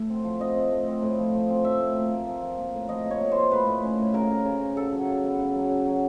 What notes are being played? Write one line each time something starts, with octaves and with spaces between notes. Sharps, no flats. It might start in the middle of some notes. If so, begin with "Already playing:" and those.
Already playing: A2 A3
C4
F3
C4 D#5
C4
A3
C4
A2
F3
F3
C4
F3 E5
A2
A#3
A#3
F3
F3
A#3
A2
F3 D#5
A#3
C#5
A#3
A#3 C5
A2 B4
A2
C#4
A2
C#3 A#4
C#3
C#3
C#3
C#3 A4
F#3
C#3
B3
C#3
F#3
C#3
F#3